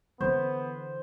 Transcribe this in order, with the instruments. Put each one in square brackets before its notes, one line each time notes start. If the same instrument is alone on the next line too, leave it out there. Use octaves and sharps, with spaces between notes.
[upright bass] D3 E3 [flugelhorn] B3 [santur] C5